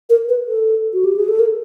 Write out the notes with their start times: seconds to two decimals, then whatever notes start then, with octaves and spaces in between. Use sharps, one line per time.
0.10 A#4
0.29 B4
0.47 A4
0.93 F#4
1.05 G4
1.16 G#4
1.28 A4
1.39 A#4